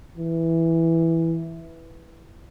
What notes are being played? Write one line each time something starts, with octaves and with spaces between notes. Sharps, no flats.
E3